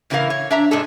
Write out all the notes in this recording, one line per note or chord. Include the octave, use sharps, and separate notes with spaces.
A2 C#3 E3 E4 A#4 F5
C#5
D4 E5 A#5
G#2 C3 G#3 D4 A4